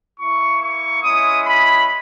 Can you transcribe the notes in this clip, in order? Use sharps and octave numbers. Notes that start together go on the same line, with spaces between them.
A#3 E4 C#6
C#6
G#3 C#4 E4 D#6
B5